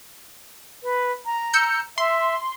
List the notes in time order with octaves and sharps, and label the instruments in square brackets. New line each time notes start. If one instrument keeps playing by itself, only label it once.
[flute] B4
A#5
[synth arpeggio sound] E6 G6 C#7
[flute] E5 [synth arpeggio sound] C6